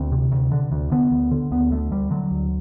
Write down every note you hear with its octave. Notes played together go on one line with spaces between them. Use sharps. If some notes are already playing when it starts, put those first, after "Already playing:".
Already playing: D2 C4
C3
D2
D3
D2
D3 B3
D2
D3
D2 B3
D3 A3
D2 G3
D3 F#3
D2